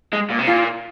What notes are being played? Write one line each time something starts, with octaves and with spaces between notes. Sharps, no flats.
G#3
A#2
C3
A#2 F4